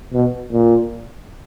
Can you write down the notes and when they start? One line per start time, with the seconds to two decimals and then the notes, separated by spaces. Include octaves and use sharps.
0.13 B2
0.52 A#2